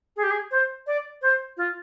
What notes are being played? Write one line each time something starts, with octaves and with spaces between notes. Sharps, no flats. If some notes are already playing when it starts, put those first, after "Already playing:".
G#4
G4
G#4
C5
D5
C5
F4